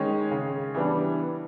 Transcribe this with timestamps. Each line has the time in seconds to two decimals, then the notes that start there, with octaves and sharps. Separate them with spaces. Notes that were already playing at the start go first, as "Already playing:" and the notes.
Already playing: D#3 G#3 C#4
0.31 C#3
0.74 E3 G3 B3 D4